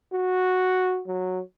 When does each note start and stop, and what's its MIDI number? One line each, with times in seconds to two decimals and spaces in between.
0.12 1.01 66
1.07 1.39 54